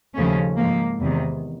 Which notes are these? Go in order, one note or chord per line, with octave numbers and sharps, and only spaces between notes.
D#2 C#3 F3 A3 C#4
G#2 F3 A#3
E2 C3 D#3